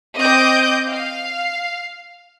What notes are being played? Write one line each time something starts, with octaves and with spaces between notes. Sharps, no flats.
C4 D#5 D6 G6
F5